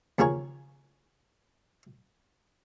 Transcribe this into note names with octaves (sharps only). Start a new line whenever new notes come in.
D#2 C#3 F3 G#4 A#4 C#5